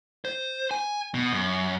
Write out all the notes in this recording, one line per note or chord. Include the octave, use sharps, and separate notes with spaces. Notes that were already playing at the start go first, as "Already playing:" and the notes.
C5
G#5
B2
F#2